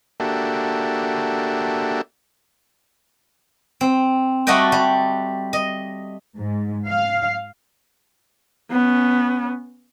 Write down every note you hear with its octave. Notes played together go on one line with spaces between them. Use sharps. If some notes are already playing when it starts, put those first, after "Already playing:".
A#3 D4 F#4 G4 A4 E5
C4
G3 A3 F#4 D5 D#5 G5
G3
D#5
G#2
F5
B3 C#4